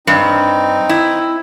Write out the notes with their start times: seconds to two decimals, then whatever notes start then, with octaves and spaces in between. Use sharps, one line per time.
0.07 G2 C4 D#4
0.89 E4